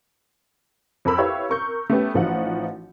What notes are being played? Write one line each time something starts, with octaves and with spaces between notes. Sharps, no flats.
F2 A4 A#4 B5 E6
E4 G4 B4 C#5 F5
A#4 C#6 G6
A3 B3 C#4 G4
A1 E3 F3 D#4 F#4 F#5